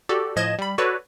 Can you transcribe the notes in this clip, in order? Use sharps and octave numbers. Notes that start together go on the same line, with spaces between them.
F#4 G4 A4 D5
A2 F3 D#5 G#6 E7
G3 B5
F#4 A4 B4 C#5 D5